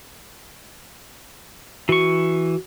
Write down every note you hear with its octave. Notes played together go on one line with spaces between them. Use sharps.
E3 F#4 C#6